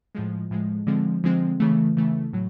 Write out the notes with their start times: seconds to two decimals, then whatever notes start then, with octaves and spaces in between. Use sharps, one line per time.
0.15 A2 F3 G#3
0.51 A2 F3 G#3
0.87 D3 F3 G#3 C4
1.24 D3 F3 G#3 C4
1.60 C#3 E3 A3
1.97 C#3 E3 A3
2.33 A2 F#3